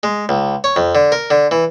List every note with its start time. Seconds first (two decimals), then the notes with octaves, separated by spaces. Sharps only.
0.03 G#3
0.29 C#2
0.64 C#5
0.76 F2
0.95 D3
1.12 A#4
1.31 D3
1.51 E3